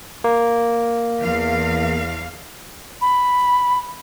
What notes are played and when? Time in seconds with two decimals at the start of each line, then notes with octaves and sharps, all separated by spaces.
0.24 A#3
1.19 E2 F5
3.01 B5